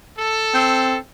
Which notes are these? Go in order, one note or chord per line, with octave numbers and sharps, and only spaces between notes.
A4
C4